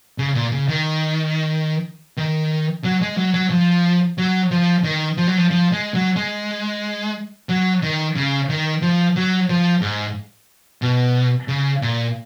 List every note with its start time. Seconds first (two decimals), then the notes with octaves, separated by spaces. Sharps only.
0.18 C#3
0.35 A#2
0.51 C#3
0.68 D#3
2.17 D#3
2.84 F#3
3.01 G#3
3.17 F#3
3.34 F#3
3.50 F3
4.18 F#3
4.51 F3
4.84 D#3
5.17 F3
5.27 F#3
5.37 F3
5.51 F3
5.72 G#3
5.95 F#3
6.16 G#3
7.49 F#3
7.82 D#3
8.16 C#3
8.49 D#3
8.82 F3
9.16 F#3
9.49 F3
9.82 G#2
10.82 B2
11.48 C#3
11.82 A#2